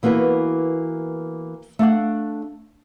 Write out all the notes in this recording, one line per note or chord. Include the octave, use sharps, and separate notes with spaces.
E3 A#3 B3 F#4 B4
A3 D4 F5 F#5